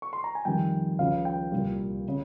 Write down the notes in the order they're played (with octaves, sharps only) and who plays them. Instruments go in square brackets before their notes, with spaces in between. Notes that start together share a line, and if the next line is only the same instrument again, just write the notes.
[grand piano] C#6
C6
A#5
G#5
F2 D#3 G3 G5
C#2 C#3 F3 F5
G5
C2 A#2 G3
C#3